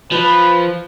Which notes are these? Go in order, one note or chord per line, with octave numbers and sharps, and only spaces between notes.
F3 B4